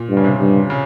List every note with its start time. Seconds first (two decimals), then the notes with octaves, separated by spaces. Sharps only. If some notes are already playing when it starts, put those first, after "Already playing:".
Already playing: A#2
0.09 G2
0.17 C#3
0.24 C3
0.39 G2
0.70 C#3